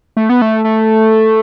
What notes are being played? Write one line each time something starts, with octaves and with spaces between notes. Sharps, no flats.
A3
B3
A3
A3